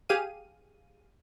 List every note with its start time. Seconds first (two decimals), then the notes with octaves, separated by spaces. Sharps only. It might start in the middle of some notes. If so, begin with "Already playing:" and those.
0.09 G4 G#4 F5 D#7